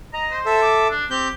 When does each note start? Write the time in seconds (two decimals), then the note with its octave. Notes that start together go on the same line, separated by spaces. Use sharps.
0.13 D#5 A#5
0.31 C5
0.46 A4 E5
0.62 D6
0.90 D4
1.10 C4 G4 G6